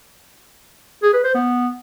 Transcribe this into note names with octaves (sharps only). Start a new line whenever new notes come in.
G#4
B4
C5
B3